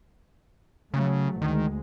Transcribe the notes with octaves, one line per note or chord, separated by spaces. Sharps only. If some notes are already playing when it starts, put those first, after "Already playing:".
C#3 F#3 A3
D2 D#3 G#3